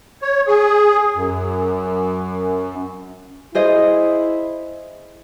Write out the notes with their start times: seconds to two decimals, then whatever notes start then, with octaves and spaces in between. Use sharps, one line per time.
0.22 C#5
0.47 G#4
1.15 F#2
3.55 E4 G#4 C5 D#5